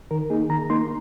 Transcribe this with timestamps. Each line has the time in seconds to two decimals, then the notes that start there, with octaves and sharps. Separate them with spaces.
0.11 D#3 A#4
0.30 A#3 D#4 G#4
0.50 D#3 A#5
0.70 A#3 D#4 C6